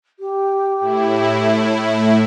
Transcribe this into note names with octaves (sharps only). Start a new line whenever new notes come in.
G4
A2 E4